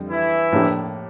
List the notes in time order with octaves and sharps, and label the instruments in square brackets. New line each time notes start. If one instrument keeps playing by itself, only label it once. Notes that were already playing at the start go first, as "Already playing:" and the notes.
Already playing: [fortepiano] F2 D3 G3
[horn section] E3 E4
[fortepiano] A2 F3 A#3 D4 G4